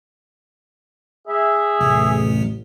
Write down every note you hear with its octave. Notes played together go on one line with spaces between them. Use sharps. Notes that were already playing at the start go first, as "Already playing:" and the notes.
G#4 E5
A1 E2 C3 F#3